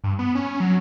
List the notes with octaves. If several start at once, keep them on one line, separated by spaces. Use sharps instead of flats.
G2
B3
C#4
F#3